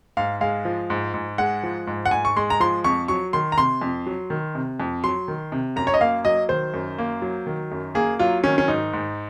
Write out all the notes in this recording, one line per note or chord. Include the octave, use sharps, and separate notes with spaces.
G#2 F5
G#3 F5
F3
G#2
G#2
G#3 F#5
F3
G#2
F#5
G#2 G#5
C#6
G#3 C6
A#5
F3 C6
F2 C#6
F#3 C#6
D#3 C6
A#5
C3 C6
F2
F#3
D#3
C3
F2
F#3 C6
D#3
C3
F#2 A#5
C#5
D#5
A#3 F5
F#3 D#5
D#3 C5
F#2
A#3
F#3
D#3
F#2
A#3 G#4
F#3 F4
D#3 C#4
C#4
G#2 D#4
G#2